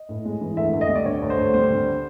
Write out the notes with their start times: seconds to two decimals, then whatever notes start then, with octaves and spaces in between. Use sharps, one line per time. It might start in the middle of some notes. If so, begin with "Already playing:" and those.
Already playing: D#5
0.09 A2
0.25 G#3
0.41 E3
0.57 D2 E5
0.73 D2
0.81 D#5
0.89 G3
0.95 D5
1.05 D3 C#5
1.22 D2
1.30 C5
1.37 D2
1.54 G3 C5
1.70 D3